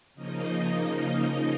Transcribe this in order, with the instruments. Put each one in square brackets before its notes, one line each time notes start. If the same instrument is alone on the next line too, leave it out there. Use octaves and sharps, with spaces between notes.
[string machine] C#3 F3 A#3 D#4 D#5